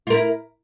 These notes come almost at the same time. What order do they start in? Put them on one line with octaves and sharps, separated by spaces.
F4 A#4 E4